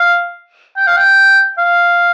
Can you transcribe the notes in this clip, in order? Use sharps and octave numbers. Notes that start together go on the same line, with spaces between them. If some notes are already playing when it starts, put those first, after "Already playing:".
Already playing: F5
G5
F5
G5
F5